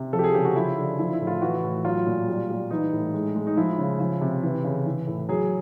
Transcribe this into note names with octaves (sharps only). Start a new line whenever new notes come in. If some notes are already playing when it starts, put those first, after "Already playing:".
Already playing: C3
F3 A4
G4
G#4
C#3 G4
F#4
F3 E4
D3
F3 E4
E4
A2
F4
E3 F#4
A2
F#3 F4
A#2
G3
G3
E3 D#4
A2
G#3
G#3
D#4
F3 E4
C#3
F3
C3
E3
C#3
E3
A2
F#3 G#4